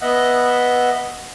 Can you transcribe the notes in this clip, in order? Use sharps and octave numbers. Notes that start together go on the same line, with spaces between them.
B3 D#5 E5 F#5